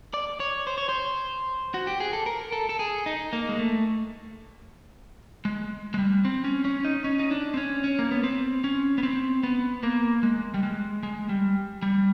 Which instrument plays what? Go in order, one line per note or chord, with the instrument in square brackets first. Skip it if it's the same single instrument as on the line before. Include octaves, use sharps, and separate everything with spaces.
[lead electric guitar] D5
C#5
C5
C#5
C5
F#4
G4
G#4
A4
A#4
A4
A4
G#4
D#4
A#3
G#3
A3
G#3
G#3
G3
C4
C#4
C#4
D#4
C#4
D#4
D4
C4
C#4
C#4
A#3
B3
C4
C#4
B3
C4
B3
A#3
G#3
G3
G#3
G#3
G3
G3